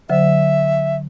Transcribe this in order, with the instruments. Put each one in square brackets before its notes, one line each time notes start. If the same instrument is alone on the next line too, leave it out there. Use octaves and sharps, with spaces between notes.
[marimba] D3 F#3 C5 [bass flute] E5